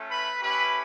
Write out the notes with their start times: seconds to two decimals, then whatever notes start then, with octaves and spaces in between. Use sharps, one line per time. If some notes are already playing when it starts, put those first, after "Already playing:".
Already playing: A3 C#4 F4
0.11 B4 B5
0.41 A3 C#4 E4 G4 B4 B5